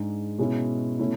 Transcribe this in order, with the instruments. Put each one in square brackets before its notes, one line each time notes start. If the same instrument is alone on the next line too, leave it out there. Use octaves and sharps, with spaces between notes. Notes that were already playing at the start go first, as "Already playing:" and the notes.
Already playing: [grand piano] G#2 G#3 D4
B2 G#3 C#4 E4
B2 A3 C#4 E4